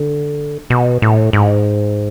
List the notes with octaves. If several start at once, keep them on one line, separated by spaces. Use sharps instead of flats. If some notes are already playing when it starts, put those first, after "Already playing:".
Already playing: D3
B2
A2
G#2